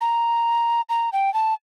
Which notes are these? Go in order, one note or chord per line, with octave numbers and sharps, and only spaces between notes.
A#5
A#5
G5
A5